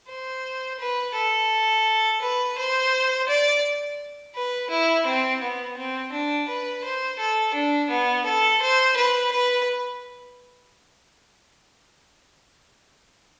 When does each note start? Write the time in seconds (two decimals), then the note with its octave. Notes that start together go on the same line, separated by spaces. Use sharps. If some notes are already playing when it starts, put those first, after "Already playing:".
0.08 C5
0.80 B4
1.14 A4
2.21 B4
2.58 C5
3.28 D5
4.35 B4
4.70 E4
5.06 C4
5.41 B3
5.77 C4
6.12 D4
6.48 B4
6.84 C5
7.19 A4
7.54 D4
7.90 B3
8.25 A4
8.61 C5
8.96 B4
9.32 B4